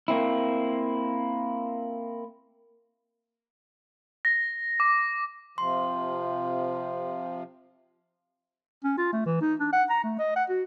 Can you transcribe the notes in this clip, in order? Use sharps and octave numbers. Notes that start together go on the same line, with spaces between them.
A#3 C4 E4
A#6
D6
C3 F3 C6
C#4
F4
A3
E3
D#4
D4
F#5
A#5
A3
D#5
F#5
F#4